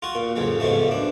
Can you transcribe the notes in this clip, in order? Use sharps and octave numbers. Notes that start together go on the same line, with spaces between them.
F4 F#4
A#2
A1 F2 C#3 F#3
G#2 B2 F3 A3
F#2 D4